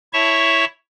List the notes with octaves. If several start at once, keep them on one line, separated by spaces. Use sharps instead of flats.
E4 C#5 E5 A5 C#6